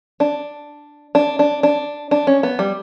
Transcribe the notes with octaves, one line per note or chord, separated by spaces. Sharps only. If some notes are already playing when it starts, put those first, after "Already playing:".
D4
D4
D4
D4
D4
C#4
B3
G3